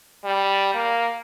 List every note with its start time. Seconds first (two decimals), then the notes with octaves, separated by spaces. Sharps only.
0.24 G3
0.74 A#3